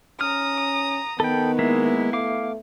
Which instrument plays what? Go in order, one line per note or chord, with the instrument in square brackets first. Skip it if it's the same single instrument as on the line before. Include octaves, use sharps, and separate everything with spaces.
[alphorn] C#4 [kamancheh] A#5 D#6 [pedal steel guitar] F6
[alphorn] D#3 [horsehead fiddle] B3 [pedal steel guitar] A4 G5 [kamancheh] B5
[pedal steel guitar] G#3 A#3 E5 [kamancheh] E4
[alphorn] A3 [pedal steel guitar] F5 D6